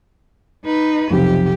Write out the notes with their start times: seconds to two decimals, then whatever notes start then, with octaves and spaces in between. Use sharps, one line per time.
0.64 D#4 B4
1.10 B1 F2 C3 G4